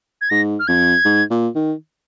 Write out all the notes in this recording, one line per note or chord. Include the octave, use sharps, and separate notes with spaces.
G#6
G#2 A#6
F6
F2 G#6
G#2
A#2
D#3